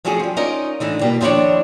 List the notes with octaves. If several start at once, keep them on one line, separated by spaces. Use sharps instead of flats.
F3 F#3 A3 C#4 F#4 G#4
F3 G3
C#4 D#4 F4 A#4 D5 D#5
A2 D3 E3 D#4
B2 G3 A#3
D#2 F3 D4 E4 C#5 D5